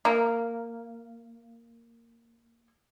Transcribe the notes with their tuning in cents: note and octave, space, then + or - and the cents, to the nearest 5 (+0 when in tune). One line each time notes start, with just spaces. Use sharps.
A#3 -10